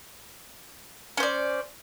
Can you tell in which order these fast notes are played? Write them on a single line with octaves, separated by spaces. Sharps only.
C#4 C5 D5